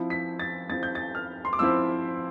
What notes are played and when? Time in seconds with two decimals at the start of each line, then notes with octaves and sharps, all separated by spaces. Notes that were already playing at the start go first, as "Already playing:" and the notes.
Already playing: F3 C4 E4
0.10 B6
0.39 A6
0.69 F3 C4 E4 A6
0.83 G6
0.95 A6
1.15 F6
1.45 C6
1.53 D6
1.59 F3 C4 E4 E6